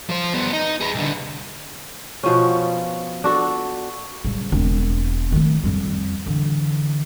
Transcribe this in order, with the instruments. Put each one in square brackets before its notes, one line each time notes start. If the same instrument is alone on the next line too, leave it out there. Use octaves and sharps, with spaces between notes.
[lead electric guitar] F3 C5
G3 B3
D#4
G#4 B4
C2 D3
[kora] B2 F3 C#4
D4 F#4 A4
[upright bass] C#3 G3
E1 C4
D#3 A3
F2 G3
D3 E3